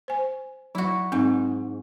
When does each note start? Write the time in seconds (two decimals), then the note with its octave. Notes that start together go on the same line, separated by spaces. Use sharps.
0.08 C5 G#5
0.75 F#3 E4 F#4
1.12 G#2 C4